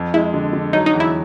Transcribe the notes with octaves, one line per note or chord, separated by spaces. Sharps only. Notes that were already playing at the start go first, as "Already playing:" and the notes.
Already playing: F2
G#3 E4
D3
D3
F#3 D#4
D#4
E2
E4